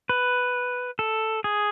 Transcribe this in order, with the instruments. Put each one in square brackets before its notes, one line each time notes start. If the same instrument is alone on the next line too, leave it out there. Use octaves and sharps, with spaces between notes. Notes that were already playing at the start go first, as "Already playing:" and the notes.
[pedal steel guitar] B4
A4
G#4